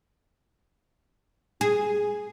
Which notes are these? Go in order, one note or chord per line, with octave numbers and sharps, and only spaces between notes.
G#4